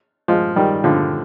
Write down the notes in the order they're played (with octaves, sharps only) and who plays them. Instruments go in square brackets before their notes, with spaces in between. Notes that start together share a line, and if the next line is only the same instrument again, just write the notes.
[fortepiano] F3 G#3
D#3 G3
D3 F3